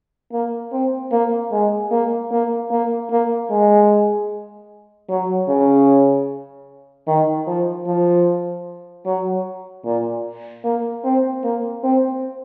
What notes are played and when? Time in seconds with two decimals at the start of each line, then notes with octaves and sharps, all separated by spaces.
0.32 A#3
0.72 C4
1.12 A#3
1.52 G#3
1.91 A#3
2.31 A#3
2.71 A#3
3.11 A#3
3.50 G#3
5.09 F#3
5.48 C#3
7.08 D#3
7.47 F3
7.87 F3
9.06 F#3
9.85 A#2
10.64 A#3
11.04 C4
11.44 A#3
11.83 C4